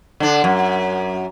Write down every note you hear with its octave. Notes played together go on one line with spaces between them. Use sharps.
D3 D4
F#2